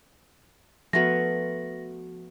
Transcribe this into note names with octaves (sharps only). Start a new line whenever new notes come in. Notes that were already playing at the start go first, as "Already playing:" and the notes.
F3 A3 B3 F#4 A#6